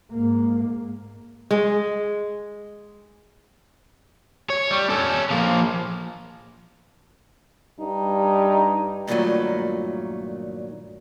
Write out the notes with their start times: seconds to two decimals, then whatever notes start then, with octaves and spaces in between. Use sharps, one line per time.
0.12 G#2 A#3
1.51 G#3
4.50 C#5
4.71 G3
4.90 C#4 A4
5.30 F3 A#3
7.80 G2 D#4
9.07 G2 A#2 D#3 F#3 A3